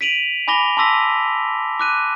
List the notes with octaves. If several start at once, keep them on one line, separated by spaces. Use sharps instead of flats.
B6 D7 D#7 F7 F#7
G#5 B5 D6 A#6 F7 G7
A5 C6 D6 E6 A#6 B6
D6 F#6 D#7